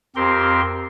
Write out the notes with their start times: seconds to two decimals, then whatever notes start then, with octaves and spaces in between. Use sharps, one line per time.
0.16 F2 C4 G4 A#4 C6